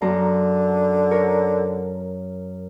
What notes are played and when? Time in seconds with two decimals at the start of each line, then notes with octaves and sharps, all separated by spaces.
0.02 F#2 D3 A#5 C6
1.11 A#4 C#5